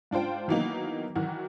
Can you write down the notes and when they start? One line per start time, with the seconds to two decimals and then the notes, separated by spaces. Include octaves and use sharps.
0.11 G#2 D4 F4 C5 G5
0.48 D#3 E3 F#3 A#3 B3 D#4
1.15 D#3 E3 F#3 F#4